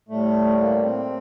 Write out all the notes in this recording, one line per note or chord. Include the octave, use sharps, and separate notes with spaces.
A2 G3 A3
A#3
C4